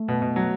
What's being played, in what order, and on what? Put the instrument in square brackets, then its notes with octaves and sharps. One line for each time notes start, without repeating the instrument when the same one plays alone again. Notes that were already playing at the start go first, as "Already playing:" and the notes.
Already playing: [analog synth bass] A3
[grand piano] B2
B2
F#3